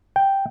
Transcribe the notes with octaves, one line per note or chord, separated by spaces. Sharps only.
G5